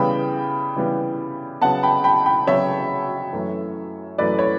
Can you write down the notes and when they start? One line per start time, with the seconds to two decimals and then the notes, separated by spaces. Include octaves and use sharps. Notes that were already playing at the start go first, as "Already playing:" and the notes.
Already playing: C#3 E3 G3 B3 G5 B5
0.76 C#3 E3 G3 B3
1.61 C#3 F#3 B3 F#5 A5
1.83 G5 B5
2.04 G5 B5
2.26 G5 B5
2.47 C#3 F#3 B3 C#5 E5
3.33 F#2 E3 A3
4.18 F#2 E3 A3 B4 D5
4.39 C#5